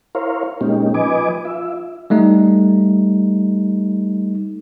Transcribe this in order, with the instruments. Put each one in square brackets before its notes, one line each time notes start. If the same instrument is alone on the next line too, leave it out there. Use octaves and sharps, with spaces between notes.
[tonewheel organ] E4 A#4 C5 C#5 F5
A#2 G#3 A#3 C#4 D#4 G4
F3 B4 D#5 G#5 D6
F4 E5
[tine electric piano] G3 A3 D#4